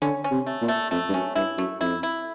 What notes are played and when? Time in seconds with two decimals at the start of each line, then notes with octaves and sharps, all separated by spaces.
0.01 D3 C#4
0.24 C#4
0.31 C3
0.46 A3
0.61 A#2
0.68 A3
0.91 F2 A3
1.09 G2
1.14 F#2 C#4
1.36 G2 E4
1.58 F#2 A3
1.81 F2 E4
2.03 E4